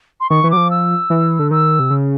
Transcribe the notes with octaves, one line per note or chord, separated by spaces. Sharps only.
C6
D#3 C#6
E3
F#3 D6
F3
E6
E3
D3
D#3 E6
C3
C#3